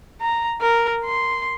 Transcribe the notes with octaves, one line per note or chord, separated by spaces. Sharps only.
A#5
A#4
C6